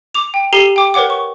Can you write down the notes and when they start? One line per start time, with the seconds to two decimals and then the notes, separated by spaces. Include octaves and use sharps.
0.15 D6 F7
0.34 G5
0.53 G4 A4 A#5 C7 D#7 G7
0.76 G5 D6
0.94 A#4 B4 C#5 F#5 D6
1.10 C#6